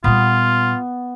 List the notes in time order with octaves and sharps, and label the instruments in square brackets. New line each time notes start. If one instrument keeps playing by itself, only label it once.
[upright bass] A#2 G3 [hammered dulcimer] B3 [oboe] F4